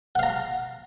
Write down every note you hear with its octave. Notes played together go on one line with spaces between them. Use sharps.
F5 F#5 A#5